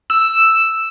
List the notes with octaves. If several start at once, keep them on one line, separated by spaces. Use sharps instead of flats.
E6